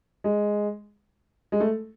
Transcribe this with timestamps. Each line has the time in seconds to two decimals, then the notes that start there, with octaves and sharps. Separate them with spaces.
0.24 G#3
1.52 G#3
1.60 A3